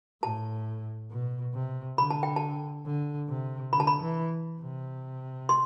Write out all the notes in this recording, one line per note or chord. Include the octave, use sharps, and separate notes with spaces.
A2 A5
B2
C3
D3 B5
A5
G5
A5
D3
C3
D3 B5
A5
B5
E3
C3
C6